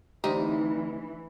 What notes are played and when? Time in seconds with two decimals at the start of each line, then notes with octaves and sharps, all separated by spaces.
0.24 D2 E3 C4 D#4 G4